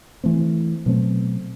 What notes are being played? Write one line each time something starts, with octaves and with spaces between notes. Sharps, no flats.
E3 A3 C4
B2 F#3 A3 C4